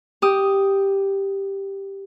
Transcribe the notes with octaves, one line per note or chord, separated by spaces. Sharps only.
G4 D#6